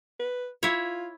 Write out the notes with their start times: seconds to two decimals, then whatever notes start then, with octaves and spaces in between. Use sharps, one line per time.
0.20 B4
0.63 E4 F4 C#5